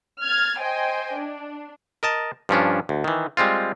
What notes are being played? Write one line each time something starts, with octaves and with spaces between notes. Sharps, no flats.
F6 G#6 A6
C5 D#5 G5 G#5
D4
A#4 D#5 A5
G2 F3 C#4 D4
D2
D#3 E3
G3 G#3 C4 F4